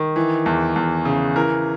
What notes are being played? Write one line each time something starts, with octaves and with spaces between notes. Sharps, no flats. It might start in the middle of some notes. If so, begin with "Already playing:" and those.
Already playing: D#3
E3
E2
E2
C#3
E3 A#4